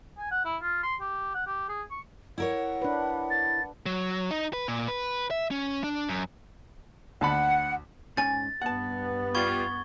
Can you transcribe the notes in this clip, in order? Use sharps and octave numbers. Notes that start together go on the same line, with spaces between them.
G#5
F#5
E4
F4
C6
G4
F#5
G4
G#4
C#6
E4 A#4 C#5 F#5
D4 B4
A6
F#3
D#4
B4
A#2
B4
E5
C#4
D4
F#2
D2 F#5 A5 B5
G#2 C#4 G#5 A6
G2 B3 F#5 A5
G3 F4 C#6 G#6 G7